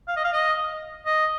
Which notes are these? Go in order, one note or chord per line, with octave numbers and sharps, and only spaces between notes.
F5
D#5
F5
D#5
D#5